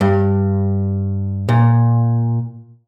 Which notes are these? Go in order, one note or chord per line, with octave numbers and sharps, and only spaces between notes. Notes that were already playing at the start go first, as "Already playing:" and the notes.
G2
A#2